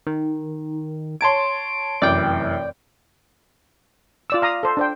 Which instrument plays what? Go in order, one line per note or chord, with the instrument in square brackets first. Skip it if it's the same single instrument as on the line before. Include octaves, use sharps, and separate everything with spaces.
[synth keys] D#3
[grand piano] C#5 A5 G#6 [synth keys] C6 D7
[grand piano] F1 F#2 E3 [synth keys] D5 G5
[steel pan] F4 D5 E6
F5 A#5 D#6
A4 C5
D4 C5 G5